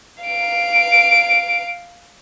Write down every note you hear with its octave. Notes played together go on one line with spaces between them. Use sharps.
F5 D7